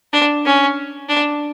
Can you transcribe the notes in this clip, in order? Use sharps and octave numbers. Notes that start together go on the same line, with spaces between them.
D4
C#4
D4